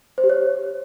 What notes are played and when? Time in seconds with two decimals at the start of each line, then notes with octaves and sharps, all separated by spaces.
0.18 C5
0.24 G4
0.30 C#5